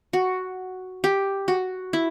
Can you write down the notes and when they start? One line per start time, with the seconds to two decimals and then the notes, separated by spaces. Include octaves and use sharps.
0.13 F#4
1.04 G4
1.48 F#4
1.93 E4